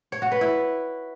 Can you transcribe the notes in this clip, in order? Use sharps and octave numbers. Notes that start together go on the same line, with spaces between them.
C#5
F#4
B4
E4